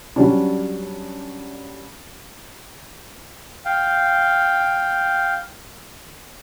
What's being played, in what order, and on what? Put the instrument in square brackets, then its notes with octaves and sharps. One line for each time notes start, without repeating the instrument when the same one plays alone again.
[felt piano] F#3 G3 C#4 D4
[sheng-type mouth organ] F5 G5